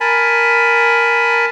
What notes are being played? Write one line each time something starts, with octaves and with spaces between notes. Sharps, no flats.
A#4 G#5 A5 B5